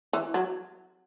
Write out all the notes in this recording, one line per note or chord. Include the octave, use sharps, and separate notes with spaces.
E3
F#3